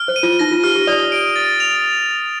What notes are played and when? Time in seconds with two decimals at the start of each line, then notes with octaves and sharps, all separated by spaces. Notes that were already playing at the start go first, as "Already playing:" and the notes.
Already playing: F6
0.08 C5
0.16 D#7
0.23 F4
0.39 D#4 A#6
0.51 F4
0.64 G4 F6
0.76 G4
0.87 D5 D#6
1.12 D7
1.36 A6
1.60 F7